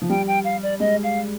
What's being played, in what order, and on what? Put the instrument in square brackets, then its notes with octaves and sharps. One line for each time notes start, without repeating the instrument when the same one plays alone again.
[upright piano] F3
[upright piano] G3 [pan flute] G5
[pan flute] G5
F5
D5
[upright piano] G#3 [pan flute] D#5
[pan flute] F5